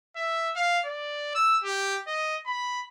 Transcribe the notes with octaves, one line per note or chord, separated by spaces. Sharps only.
E5
F5
D5
E6
G4
D#5
B5